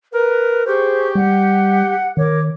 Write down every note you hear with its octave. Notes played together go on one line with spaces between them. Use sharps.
A#4 B4
G4 G#4 C5 C#6
G3 F#5
D#3 A#4 C#5 D6